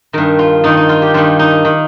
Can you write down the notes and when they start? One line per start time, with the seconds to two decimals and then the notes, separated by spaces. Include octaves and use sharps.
0.13 G2 D#3 A#4
0.39 F4
0.64 G2 D#3 D#4
0.77 D#4
0.89 F4
1.02 G4
1.14 G2 D#3 F4
1.39 D#4
1.65 D#3